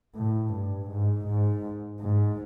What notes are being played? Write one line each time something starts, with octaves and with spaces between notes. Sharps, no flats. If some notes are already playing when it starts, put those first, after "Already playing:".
A2
G2
G#2
G#2
G#2